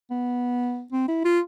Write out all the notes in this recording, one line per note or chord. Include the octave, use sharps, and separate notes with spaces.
B3
C4
E4
F4